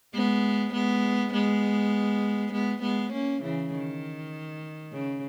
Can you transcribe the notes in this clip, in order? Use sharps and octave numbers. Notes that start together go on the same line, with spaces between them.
G#3 B3
G#3 B3
G#3 B3
G#3 B3
G#3 B3
A#3 C#4
C#3 E3
D#3
C#3